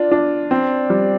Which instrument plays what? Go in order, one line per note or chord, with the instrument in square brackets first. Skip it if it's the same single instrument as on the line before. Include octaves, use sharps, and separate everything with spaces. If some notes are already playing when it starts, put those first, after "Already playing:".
Already playing: [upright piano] D4 F4
D4
C4
G3